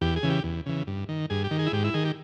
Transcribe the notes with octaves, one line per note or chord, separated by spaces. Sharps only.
E2 G4
G#4
C#3 E3
G4
E2
C#3 E3
G2
D#3
G2 G#4
G4
D#3
G#4
E4
G#2 G4
E4
D#3 G#4
G4